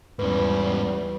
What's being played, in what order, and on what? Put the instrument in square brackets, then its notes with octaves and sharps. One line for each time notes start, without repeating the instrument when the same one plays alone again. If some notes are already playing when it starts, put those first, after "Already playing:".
[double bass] E2 G3 [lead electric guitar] G#2 C#4 [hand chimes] B4